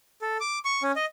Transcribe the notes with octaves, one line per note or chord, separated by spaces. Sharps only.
A4
D6
C#6
C#4
D#5